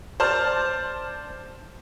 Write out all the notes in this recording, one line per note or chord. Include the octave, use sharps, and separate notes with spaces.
C5 D5 A5 F6